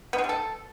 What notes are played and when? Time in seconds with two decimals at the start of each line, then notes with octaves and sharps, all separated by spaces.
0.13 B3
0.18 G#3
0.24 G3
0.29 A4